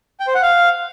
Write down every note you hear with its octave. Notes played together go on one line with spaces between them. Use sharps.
G5
C5
F#5
F5